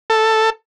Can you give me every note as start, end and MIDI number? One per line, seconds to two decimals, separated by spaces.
0.10 0.50 69